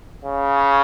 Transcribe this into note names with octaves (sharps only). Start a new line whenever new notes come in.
C#3